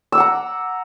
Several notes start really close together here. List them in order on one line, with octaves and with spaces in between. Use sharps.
E6 D6 F#5 A#5